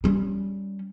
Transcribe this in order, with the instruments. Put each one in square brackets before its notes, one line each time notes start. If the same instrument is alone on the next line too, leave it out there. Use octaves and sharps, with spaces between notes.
[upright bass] G3 C#4